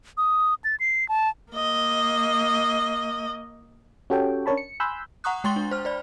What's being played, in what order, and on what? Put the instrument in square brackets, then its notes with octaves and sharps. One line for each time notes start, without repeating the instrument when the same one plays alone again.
[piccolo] D#6
A6
C7
A5
[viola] A#3 D#5
[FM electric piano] C#4 F#4 G4 A4 C#5 G5
C#4 D4 A#4 C#5 A5 B5
C#7
G#5 B5 C6 E6 F#6 G6
[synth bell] F#5 A#5 C#6 D#6 F#6
G#3 G5 C6 C#6 A6 G7
D4
C5 F6
C5 D5 B5